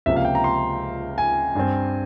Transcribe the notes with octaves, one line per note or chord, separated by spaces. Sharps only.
C#2 C3 F3 A#3 E5
F5
G5
A#5
C6
G#5
G2 G3 C4